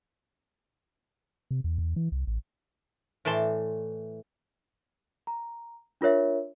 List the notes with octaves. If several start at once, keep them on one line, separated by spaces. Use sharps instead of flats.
C3
E2
E2
E3
C2
A1
A2 E3 D5 A5 C6
A#5
D4 F4 A#4 C#5 E5